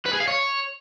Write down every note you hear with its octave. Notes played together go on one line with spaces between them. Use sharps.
B4
G#4
F5
C#5